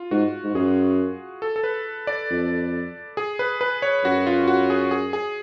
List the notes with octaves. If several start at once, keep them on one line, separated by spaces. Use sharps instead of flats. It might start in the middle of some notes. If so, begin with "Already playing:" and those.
Already playing: F4
G#2 F#4
G#2
F#2 G#4
A4
A4
B4
D5
F2
G#4
B4
B4
C#5
F#2 F#4
F4
F#4
G#4
G#4
G#4